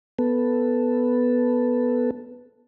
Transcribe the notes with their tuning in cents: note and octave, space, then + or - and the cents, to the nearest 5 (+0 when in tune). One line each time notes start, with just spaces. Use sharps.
B3 +0 A4 +0